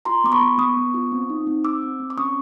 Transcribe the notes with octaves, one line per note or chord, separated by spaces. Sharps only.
F4 A#5 C6
B3 D6
B5 C#6
B3
B3 C#6 D#6
B3
F4
C4
D#4
C4
C4 D6 E6
C4
C4
D6
C#4 C#6 D#6